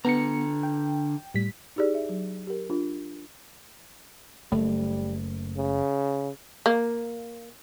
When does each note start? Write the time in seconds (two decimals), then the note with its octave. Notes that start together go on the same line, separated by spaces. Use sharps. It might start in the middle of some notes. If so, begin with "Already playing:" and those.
0.05 D3 B3 A#5 C#7
0.63 G5
1.34 A2 G3 B6
1.76 D#4 E4 G4 G#4 D5
1.95 E5
2.09 F#3
2.47 G4 A#4
2.70 D4 F4
4.52 F#1 G3 A3
5.57 C#3
6.66 A#3